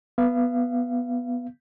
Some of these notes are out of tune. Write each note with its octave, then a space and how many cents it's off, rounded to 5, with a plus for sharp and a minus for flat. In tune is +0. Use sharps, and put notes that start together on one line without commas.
B3 -5 F5 -35